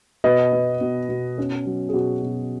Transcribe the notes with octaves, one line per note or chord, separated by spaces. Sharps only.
B2 B4 D#5
B3
B2
B2
C#4
F#3
G#4
B2 F#4
B2